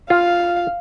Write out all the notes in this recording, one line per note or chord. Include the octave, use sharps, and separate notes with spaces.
F4 F5